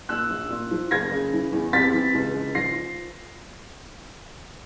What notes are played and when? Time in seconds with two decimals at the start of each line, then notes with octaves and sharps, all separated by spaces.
0.09 A#2 E6 F#6
0.30 A#1
0.50 A#2
0.71 F3
0.91 F#1 G#6 A#6
1.11 C#3
1.33 E3
1.53 E2
1.73 C3 A6 B6
1.94 E3
2.14 C#2
2.35 C#2
2.55 F3 A#6 C7